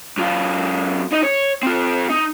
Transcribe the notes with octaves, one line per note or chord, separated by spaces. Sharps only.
F#2 F4
D#4 D#5
C#5
C4 F4
D#4